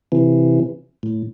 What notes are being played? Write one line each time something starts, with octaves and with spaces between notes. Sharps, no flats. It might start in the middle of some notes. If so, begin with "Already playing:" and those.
C3 E3
A2